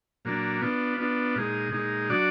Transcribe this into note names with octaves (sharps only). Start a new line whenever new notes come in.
A#2 F#3 A#3 D4
B3 D4 F4
B3 D4 F4
A#2 G#3 D#4
A#2 G#3 D#4
F#3 D4 F#4 D5